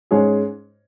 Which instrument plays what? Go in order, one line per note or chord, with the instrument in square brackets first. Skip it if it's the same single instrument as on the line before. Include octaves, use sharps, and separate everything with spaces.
[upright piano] G#2 G#3 C#4 G#4 C#5